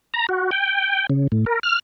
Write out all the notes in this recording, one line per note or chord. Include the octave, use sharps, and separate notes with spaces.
A#5
F#4
G5
C#3
A2
A#4
F6